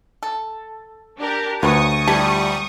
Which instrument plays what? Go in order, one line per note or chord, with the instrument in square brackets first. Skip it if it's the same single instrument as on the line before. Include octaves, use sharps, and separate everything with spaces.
[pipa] A4
[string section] D4 G4 A#4
[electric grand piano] D2 [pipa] F4 B4 C#5 [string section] C#6 D#6
[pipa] F3 E4 A5 [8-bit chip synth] G3